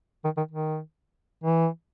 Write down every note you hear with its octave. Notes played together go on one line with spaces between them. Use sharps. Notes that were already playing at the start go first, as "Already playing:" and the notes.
D#3
D#3
D#3
E3